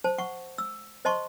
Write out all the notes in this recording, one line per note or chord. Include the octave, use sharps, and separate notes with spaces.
C5 A5
F#5 C#6
E6
C5 D#5 A5 C6 C#6